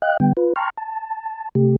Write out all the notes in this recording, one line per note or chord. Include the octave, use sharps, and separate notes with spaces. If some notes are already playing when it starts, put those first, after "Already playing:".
D#5 F5 G5 F#6
D3 G3 B3 G5
F4 B4
G5 A5 A#5 C6 C#6 F6
A5
C3 A3 G4